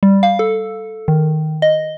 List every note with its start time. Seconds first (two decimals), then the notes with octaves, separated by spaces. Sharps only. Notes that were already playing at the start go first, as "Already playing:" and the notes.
0.03 G3
0.23 F5
0.39 A4
1.08 D#3
1.62 D#5